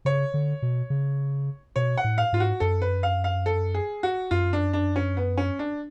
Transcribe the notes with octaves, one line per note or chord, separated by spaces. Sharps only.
C#3 C#5
D3
B2
C#3
B2 C#5
F#5
A2
F5
G#2 F4
F#4
F#2 A4
B4
F5
F5
A4
G#4
F#4
F#2 F4
D4
D4
C#4
B3
C#4
D4